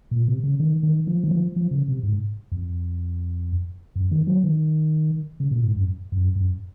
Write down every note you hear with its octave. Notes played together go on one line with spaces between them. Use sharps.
A#2
C3
C#3
D#3
D#3
F3
D#3
F3
F3
C#3
C3
G#2
F2
F#2
D#3
F#3
D#3
C#3
A#2
G#2
F#2
F#2
F#2